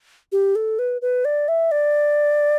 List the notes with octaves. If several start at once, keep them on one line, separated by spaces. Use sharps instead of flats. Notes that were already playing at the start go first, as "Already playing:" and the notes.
G4
A4
B4
B4
D5
E5
D5